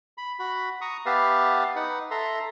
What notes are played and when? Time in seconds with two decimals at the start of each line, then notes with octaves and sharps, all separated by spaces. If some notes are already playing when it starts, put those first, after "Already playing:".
0.18 B5
0.39 F#4 B5
0.81 A#5 C#6 D#6
1.06 B3 G4 B4 E5 F5 A5
1.76 D#4 B4 F#5
2.11 A4 E5 A#5 C6